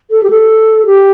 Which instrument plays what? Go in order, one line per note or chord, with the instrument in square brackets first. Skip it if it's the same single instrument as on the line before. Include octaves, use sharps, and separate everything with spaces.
[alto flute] A4
G4
A4
G4